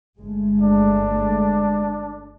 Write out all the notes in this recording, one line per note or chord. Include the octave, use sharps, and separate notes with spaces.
G1 G#3 A3
D4